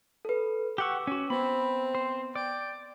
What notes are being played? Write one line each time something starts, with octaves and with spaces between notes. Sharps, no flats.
A4 B4
G4 F#5 C#6 D6 E6
C#4 F#4
B3 C4 B5
C5
D5 G5